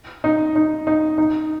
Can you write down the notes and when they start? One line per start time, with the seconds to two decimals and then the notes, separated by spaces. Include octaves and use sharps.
0.24 D#4
0.56 D#4
0.87 D#4
1.18 D#4